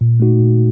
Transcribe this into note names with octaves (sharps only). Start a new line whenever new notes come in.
A#2
A3 D#4 F#4
A#2